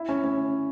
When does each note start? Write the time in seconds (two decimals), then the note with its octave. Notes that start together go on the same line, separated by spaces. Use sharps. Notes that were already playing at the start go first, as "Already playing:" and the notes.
Already playing: E4
0.09 C#4
0.24 C#4